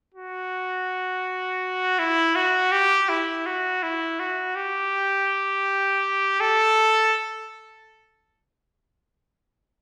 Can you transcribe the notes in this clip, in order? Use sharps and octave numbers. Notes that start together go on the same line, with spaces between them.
F#4
E4
F#4
G4
E4
F#4
E4
F#4
G4
A4